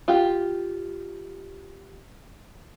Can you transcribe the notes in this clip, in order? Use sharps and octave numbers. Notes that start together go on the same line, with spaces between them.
F4 G4